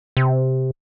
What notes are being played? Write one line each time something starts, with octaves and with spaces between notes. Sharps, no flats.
C3